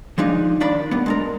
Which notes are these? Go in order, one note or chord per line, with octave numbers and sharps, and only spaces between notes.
F3 G#3 D4 D#4
F2 D#3 D4 D5 B5
G3 B3
G#3 D4 A#4